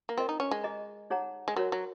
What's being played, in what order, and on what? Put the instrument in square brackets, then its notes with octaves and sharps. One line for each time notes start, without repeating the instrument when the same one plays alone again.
[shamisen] A#3
[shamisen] C4 [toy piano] F4 A#4 D#5
[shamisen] D#4
C#4
G#3
[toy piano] G#4 D#5 A#5
D#4 G#4 C#5 F#5 A#5
[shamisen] G#3
[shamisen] F#3 [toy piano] F#4 A#4 C#5
[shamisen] F#3